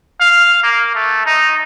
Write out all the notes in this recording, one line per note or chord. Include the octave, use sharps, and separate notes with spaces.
F5
A#3
A3
D#4